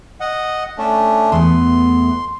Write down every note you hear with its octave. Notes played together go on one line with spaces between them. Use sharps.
D#5 F#5
A3 C#4 D4
E2 A3 B3 C6